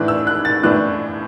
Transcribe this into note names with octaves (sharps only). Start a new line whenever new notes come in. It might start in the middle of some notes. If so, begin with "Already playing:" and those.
Already playing: A2 E3 D4 F#6
E6
F#6
A6
A2 E3 D4 F#6